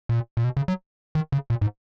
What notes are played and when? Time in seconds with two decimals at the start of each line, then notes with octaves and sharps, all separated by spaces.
0.09 A#2
0.37 A#2
0.44 B2
0.57 C#3
0.68 F#3
1.15 D#3
1.32 C#3
1.50 A#2
1.61 G#2